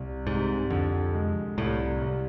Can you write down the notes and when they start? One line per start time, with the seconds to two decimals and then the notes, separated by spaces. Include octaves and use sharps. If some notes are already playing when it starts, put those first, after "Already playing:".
Already playing: C2
0.27 G#2 C3
0.70 F2 D3
1.14 G#3
1.58 C2 A2
2.02 C2